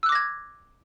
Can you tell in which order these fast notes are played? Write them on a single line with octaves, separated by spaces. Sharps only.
E6 F#6 D6 A#6 G#6